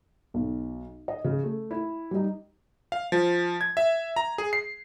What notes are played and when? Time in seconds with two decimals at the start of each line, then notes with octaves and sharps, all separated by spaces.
0.34 B1
1.08 D#5
1.24 C#3
1.43 A3
1.71 E4
2.11 G3 D#4
2.92 F5
3.12 F3
3.61 G#6
3.77 E5
4.16 A#5
4.38 G#4
4.53 C7